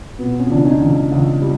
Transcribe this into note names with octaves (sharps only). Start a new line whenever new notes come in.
B2 B3
C#4
C#2 D4
C#4 D#4
C#2
C#2
G3